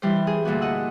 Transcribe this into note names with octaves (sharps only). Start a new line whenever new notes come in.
E3 G3 C5
G#4
D2 A#2 D4 F#4
D#5 F#5 E6